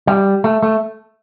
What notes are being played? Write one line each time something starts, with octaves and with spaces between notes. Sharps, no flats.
G3
A3
A3